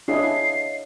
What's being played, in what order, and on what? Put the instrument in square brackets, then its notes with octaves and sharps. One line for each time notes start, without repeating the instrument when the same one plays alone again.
[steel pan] D4 E4 G#4 [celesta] C#5 D#5 F5 [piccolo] C7